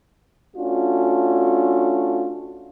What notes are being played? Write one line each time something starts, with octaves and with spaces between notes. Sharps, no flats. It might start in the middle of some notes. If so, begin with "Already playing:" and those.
A3 C#4 D4 F4 F#4